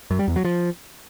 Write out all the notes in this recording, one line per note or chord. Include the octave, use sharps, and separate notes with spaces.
F#2
G3
E2
F#3
F3